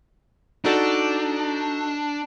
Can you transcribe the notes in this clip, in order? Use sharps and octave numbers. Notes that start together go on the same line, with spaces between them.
D4 D#4 F#4 A4